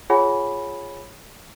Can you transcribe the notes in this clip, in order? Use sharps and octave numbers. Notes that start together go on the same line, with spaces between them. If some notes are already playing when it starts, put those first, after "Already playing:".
F4 G#4 C#5 F#5 G#5 B5